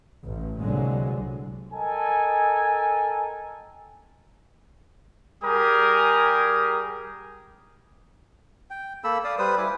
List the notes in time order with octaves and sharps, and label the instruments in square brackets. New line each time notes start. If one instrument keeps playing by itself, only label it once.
[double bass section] A1
C2 A#2 D3 F#3 G#3
[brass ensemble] A4 A#4 D#5 G5 G#5
[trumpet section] G3 G4 G#4 A#4 D#6
[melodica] G5
A#3 A4 B5 E6
D5 F5 D#6
G3 B4 C5 D#6
E4 G#5 D6